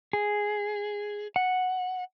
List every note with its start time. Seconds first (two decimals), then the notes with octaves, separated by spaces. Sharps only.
0.13 G#4
1.36 F#5